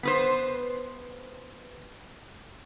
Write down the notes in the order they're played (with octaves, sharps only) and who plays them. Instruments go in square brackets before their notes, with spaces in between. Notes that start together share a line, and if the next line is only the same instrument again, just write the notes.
[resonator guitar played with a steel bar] B3 B4 C5